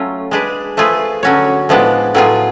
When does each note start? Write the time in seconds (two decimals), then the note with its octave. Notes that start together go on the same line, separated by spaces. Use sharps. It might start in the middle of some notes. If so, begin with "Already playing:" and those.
Already playing: F#3 A3 C#4 F4
0.31 G#3 D4 G#4 B4
0.77 F3 A3 F4 G#4 B4
1.23 D3 F#3 C#4 F#4 C#5
1.69 A2 F3 G#3 B3 D4
2.14 A2 F#3 B3 F4 G#4